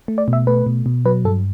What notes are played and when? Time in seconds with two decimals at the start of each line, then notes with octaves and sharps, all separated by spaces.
0.08 A3
0.18 D5
0.28 B2
0.33 E5
0.47 A3 B4
0.66 B2
0.86 B2
1.05 F#3 B4
1.25 G2 A4